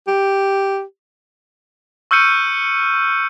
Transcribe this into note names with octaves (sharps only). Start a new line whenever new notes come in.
G4
C#6 E6 F6 G6 C#7 D#7